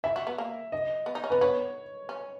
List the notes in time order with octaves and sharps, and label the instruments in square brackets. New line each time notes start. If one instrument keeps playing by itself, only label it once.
[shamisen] E4 [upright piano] E5
[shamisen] F#4
B3
A#3
[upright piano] D#5
[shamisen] B3
D#4
C#4
[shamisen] B3 [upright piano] B4
[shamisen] B3 [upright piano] C#5
[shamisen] C#4